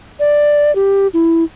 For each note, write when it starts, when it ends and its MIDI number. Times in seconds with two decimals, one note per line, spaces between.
0.20 0.73 74
0.75 1.07 67
1.14 1.44 64